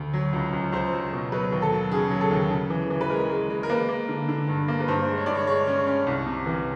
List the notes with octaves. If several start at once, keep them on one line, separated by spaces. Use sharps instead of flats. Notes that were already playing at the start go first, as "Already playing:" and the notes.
Already playing: D2
F#3
C#2
C#2
C#2 C5
F#3
B2
F#3 B4
D#2
A4
F#3
C#3 G#4
F#3
A4
D#2
C#3
E3
E3
B4
G#3 A#4
G#3
G#3
A#4
A#3 B4
A#3
D3
D3
G2
A#3
B4
G2 C5
G#3
C#5
G2 D5
C#5
G#3 C#5
C#4
C#4
C2
C3
E3